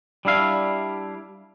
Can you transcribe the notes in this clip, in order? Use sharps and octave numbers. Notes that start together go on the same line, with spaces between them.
G3 D4 E4 F5